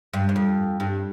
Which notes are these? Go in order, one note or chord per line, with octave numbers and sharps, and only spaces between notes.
G2
G2
F2
G2